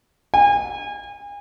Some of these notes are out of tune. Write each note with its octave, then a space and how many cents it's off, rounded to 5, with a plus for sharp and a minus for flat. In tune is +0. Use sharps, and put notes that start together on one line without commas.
G#5 -35